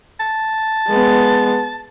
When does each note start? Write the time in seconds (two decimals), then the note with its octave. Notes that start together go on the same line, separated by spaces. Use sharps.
0.20 A5
0.88 G#3 B3